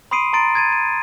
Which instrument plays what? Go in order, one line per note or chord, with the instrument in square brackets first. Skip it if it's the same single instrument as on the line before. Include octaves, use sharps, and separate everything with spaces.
[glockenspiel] B5 C6 D#6 C7 D7 D#7
A#5 C6 A6 D7
G#6 A6 D#7
D#7